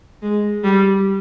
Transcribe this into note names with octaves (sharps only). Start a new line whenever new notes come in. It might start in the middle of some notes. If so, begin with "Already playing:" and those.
G#3
G3